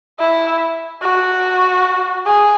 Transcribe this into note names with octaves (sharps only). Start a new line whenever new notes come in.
E4
F#4
G#4